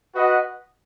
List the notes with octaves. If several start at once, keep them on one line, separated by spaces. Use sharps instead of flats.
F#4 B4 D#5 F#5